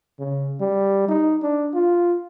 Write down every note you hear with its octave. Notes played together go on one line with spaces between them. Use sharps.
C#3
G3
D#4
D4
F4